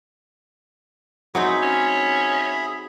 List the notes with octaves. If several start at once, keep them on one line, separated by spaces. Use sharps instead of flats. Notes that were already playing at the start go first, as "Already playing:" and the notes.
F#3 C4 D#4 G#4 E5 B5
C#4